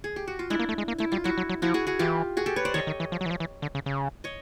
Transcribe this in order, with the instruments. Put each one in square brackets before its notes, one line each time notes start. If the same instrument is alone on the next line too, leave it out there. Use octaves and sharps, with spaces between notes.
[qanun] G#4
G4
F#4
F4
[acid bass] G#3 [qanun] D4 E4
[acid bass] A#3
A3
G#3
A#3
[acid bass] A3 [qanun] E4
[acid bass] G3 [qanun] F4
[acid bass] F#3 [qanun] E4 F#4
[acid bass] F#3
F#3
[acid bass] F3 [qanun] E4 F#4
[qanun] F#4 G#4
F#4 G#4
[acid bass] E3 [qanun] F4 G4
[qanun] F#4 G#4
G4 A4
B4 C#5
C5 D5
[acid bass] D#3 [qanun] C#5 D#5
[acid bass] D#3
E3
F3
F#3
E3
F3
E3
D3
C#3
C#3
[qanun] C#5 D#5